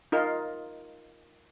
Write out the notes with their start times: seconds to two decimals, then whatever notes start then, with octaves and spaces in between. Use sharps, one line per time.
0.12 D#4 F4 A#4